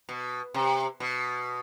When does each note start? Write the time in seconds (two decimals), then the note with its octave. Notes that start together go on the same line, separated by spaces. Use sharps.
0.09 B2
0.54 C3
1.00 B2